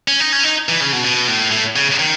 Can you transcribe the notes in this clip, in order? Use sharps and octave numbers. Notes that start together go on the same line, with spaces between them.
C#4
D#4
C#4
D#4
E3
C#3
B2
B2
A2
A2
C#3
D#3